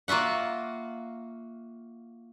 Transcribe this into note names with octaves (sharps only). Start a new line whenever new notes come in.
A#3 F4 F#4 E5 F#5